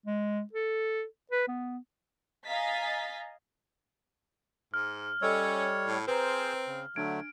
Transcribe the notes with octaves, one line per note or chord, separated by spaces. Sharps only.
G#3
A4
B4
B3
D#5 F5 G#5 A#5 A6 B6
G#2 F6
G3 C#4 A4 C#5 D#5 E6
A2
C4 G#4 B4 C5 A#5
C#3
D3 F#3 A3 D4 G#6 D7